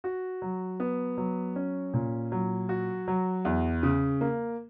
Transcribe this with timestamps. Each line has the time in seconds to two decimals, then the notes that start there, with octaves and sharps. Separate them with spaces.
0.04 F#4
0.42 F#3
0.80 B3
1.18 F#3
1.56 C#4
1.94 A#2
2.32 F#3
2.69 F#4
3.08 F#3
3.45 E2
3.83 C#3
4.21 A#3